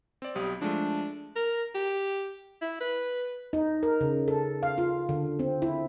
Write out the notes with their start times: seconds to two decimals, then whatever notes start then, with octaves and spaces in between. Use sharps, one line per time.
0.22 C4 D5
0.36 B1 G3 D#6
0.61 F3 G#3 A3 D4
1.36 A#4
1.75 G4
2.62 E4
2.80 B4
3.53 D#4
3.83 A#4
4.01 C#3
4.28 A4
4.63 F5
4.78 F4
5.09 D3
5.39 C4
5.62 E4